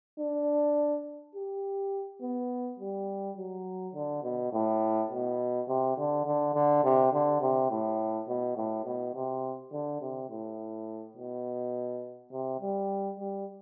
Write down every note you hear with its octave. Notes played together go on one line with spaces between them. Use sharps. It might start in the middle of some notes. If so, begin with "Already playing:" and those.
D4
G4
B3
G3
F#3
D3
B2
A2
B2
C3
D3
D3
D3
C3
D3
C3
A2
B2
A2
B2
C3
D3
C3
A2
B2
C3
G3
G3